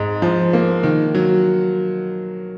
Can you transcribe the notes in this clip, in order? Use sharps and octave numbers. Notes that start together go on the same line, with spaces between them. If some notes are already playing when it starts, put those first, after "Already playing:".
Already playing: G#2
F3
A#3
D#3
F#3